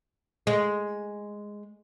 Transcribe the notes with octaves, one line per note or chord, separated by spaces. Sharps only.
G#3